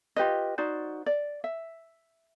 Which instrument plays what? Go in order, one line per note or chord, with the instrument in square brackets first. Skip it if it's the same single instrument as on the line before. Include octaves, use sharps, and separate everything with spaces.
[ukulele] F4 G4 B4 D#5
D#4 F#4 C5 D5
D5
E5